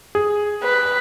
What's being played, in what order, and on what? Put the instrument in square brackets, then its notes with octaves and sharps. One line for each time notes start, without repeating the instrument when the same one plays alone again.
[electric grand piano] G#4
[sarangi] B4